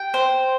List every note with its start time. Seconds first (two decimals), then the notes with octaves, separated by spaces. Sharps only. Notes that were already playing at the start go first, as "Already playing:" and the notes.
Already playing: G5
0.14 C5